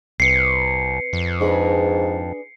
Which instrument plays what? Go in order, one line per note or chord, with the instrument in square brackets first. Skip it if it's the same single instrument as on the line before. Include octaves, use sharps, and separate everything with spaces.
[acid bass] C2 [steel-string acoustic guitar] C4 B4 [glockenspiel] C7 C#7
[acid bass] F2
[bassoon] G#2 [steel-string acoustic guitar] D4 G#4 B4